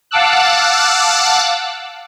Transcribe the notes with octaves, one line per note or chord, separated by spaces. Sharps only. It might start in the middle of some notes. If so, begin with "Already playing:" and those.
F5 F#5 A5 D6 E6 F#6